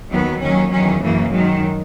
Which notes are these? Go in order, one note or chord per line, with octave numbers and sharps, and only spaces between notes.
D#2 D#3 F#3 B3
D#2 D#3 F#3 C#4
E2 D#3 F#3 C#4
F#2 C#3 E3 A#3
F#2 D#3 F#3 G#3